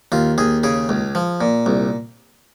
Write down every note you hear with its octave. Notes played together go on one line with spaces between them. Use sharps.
D#2 F4
D#2 G#4
C#3 G#4
C#2
F3
A#2
C2